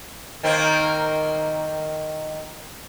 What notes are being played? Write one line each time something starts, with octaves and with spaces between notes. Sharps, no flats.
D#3 A#3 C4